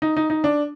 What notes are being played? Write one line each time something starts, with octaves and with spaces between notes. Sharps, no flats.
D#4
D#4
D#4
D4